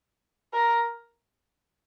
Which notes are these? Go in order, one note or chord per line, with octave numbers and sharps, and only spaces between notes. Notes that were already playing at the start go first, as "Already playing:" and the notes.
A#4